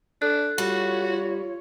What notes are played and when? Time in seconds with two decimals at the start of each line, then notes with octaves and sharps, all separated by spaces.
0.22 D4 A4 F#6
0.58 G3 F4 F#4 C#5